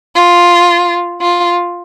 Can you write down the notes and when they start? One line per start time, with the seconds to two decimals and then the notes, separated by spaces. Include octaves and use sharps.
0.15 F4
1.21 F4